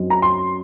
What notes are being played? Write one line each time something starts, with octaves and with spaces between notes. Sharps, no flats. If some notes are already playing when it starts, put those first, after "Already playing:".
Already playing: F#2 F#3 C4 D#4
A#5
C6